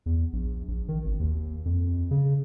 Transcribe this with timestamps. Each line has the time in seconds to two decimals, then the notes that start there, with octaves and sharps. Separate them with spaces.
0.06 E2
0.33 A#1
0.68 A#1
0.88 D#3
1.04 G#1
1.20 D#2
1.65 F2
2.11 C#3